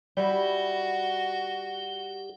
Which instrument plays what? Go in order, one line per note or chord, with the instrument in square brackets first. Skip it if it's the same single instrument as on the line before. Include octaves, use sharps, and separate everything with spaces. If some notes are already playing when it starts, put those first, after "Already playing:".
[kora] G3 E4 [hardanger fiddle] F#4 [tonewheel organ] G4